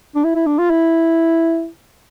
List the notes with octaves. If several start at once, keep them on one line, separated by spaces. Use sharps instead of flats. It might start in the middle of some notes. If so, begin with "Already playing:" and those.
D4
E4
E4
D4
F4
E4